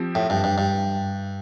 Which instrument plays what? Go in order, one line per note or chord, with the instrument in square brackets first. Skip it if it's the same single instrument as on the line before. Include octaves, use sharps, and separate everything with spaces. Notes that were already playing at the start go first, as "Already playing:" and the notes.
Already playing: [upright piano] F3 C4 G4
[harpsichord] A2
G2
G2
G2